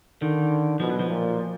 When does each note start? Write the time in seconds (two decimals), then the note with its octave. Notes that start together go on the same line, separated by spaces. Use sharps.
0.22 D3 D#3
0.80 B2 F3
0.90 F#3
1.00 F3
1.10 A#2